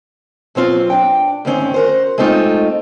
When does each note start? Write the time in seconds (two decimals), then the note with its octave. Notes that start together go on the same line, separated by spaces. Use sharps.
0.55 B2 F#3 C4 F4
0.90 D4 G5
1.45 D2 G#2 D#3 C4 C#4
1.74 F#4 A#4 C5
2.18 G#3 A3 C4 D#4 F4